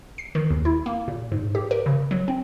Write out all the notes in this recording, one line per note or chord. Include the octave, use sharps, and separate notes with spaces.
C7
D#3
D#2
E4
A#3
A#2
G#2
G4
A#4
C#3
F#3
C4